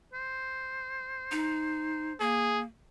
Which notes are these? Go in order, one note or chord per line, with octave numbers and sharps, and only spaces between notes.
C5
D#4
A#3 G#4